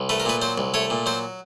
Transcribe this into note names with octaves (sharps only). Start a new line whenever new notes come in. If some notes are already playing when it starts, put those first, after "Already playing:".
Already playing: C2
A3 B4
A#4
A#2 B4
F#3 C5
C2
A3 C#5
A#2
F#3 C5